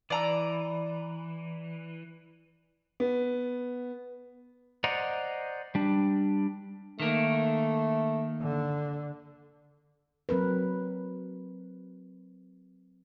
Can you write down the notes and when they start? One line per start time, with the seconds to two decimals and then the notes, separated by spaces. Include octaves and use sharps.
0.10 E3 D5 A#5 E6
3.00 B3
4.84 C5 D5 D#5 F#5 A#5
5.75 G3 D4
7.00 D#3 A3 A#3
8.41 D3
10.29 F#3 C4 A#4 B4